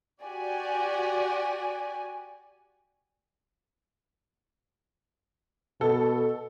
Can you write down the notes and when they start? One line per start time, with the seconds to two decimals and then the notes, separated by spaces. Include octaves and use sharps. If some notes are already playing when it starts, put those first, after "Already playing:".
0.23 F#4 G4 D5 G#5
5.81 B2 A4